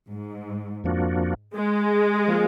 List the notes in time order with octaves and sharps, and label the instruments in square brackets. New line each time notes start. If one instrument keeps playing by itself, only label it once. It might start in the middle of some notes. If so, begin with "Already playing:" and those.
[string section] G#2
[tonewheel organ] F2 F3 A#3 D4 F#4
[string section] G#3
[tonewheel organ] F3 A#3 F4